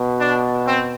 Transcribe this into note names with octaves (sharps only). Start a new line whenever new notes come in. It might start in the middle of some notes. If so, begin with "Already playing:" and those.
Already playing: B2
D4
C4